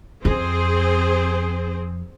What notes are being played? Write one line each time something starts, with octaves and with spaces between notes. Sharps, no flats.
F2 C4 G#4 C5